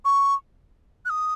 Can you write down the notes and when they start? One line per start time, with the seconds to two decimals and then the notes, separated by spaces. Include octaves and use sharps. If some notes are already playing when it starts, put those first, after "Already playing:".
0.05 C#6
1.05 F#6
1.10 D#6